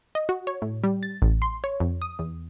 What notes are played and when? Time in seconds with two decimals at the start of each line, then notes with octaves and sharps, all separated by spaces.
0.15 D#5
0.29 F#4
0.47 C#5
0.62 A2
0.84 G3
1.03 A6
1.22 A1
1.42 C6
1.64 C#5
1.80 F2
2.02 D#6
2.19 E2